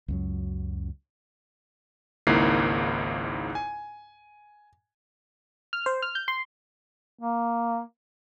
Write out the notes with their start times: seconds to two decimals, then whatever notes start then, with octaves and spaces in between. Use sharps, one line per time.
0.08 C#2 F#2 F#3
2.27 G#1 C#2 G#2 A#3 E4 C7
3.55 G#5
5.73 F6
5.86 C5
6.02 F6
6.15 G6
6.28 C6
7.20 A#3